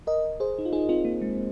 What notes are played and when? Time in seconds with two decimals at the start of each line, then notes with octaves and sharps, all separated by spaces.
0.07 A#4 D#5
0.40 G#4 C5
0.58 D#4
0.65 F4
0.73 D#4 G#4
0.89 C4 F4
1.05 A#3
1.21 G#3